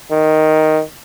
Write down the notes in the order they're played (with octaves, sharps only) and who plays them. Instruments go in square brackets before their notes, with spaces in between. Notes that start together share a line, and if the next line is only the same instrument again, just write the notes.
[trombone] D#3